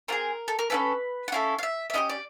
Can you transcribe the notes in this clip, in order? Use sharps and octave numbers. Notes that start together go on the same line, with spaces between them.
C4 F4 G#4 A#4
A4
A#4
C#4 E4 A4 B4
F#5
C#4 E4 A4 F5
F5
E5
E5
C#4 E4 G4 D#5
D5